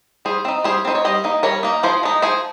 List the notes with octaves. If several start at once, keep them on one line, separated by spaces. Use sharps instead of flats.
G3 G#4 C5
C4 D#4
G3 G#4 C5
C4 D#4 C5
C#5
G3 C5 D#5
A#3 D#4
G3 A#4 C#5
A#3 D#4
F3 G#4 C5
G#3 D#4
F3 G#4 C5